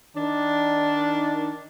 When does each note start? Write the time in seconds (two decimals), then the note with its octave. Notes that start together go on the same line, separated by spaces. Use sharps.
0.16 D#3 D4